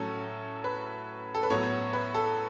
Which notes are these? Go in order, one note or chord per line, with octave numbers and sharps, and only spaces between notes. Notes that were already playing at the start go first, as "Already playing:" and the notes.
Already playing: A2 F#3 C#4 A4
B4
A4
B4
A2 F#3 B3 C#5
B4
A4